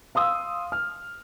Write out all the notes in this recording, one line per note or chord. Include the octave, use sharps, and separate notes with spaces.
F5 C6 D#6 E6
F6